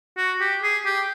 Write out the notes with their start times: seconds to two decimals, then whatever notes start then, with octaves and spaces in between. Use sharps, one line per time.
0.17 F#4
0.40 G4
0.62 G#4
0.85 G4